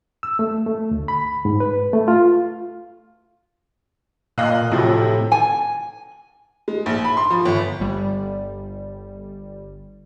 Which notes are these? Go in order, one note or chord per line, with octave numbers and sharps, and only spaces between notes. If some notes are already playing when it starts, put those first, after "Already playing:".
E6
A3
A3
D2
B5
G#2
B4
A3
F4
A#2 D#5 F5 F#6
A2 C3 F3 F#3
G#5
G#3
A#1
B5
C6
F3
G1
G1 G3